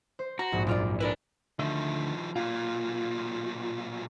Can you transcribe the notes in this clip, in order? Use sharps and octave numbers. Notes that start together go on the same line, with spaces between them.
C5
F#4 A#5
A#1 G#2
F#2 A#2 F4 D5
D4 E4 A#4 B4 D5
D2 D3 D#3 F3 E5
B1 A#2 F4